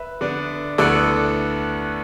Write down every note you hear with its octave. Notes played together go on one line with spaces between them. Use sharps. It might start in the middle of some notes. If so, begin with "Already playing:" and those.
Already playing: B4 E5
D3 B3 D4
D2 D3 B3 E4 A4 D5